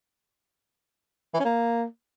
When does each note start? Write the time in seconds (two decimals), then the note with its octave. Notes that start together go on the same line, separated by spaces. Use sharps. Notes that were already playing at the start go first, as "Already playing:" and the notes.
1.34 E3
1.40 C#4
1.45 A#3